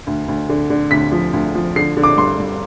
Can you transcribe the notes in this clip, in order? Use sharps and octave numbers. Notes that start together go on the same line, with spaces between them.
D2
D2
D3
D3
D2 B6
F3
D2
F3
D3 C7
D3
D6
G2 C6
G2